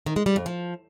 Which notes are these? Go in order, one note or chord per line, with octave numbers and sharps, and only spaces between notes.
D#3
G#3
G3
F2
F3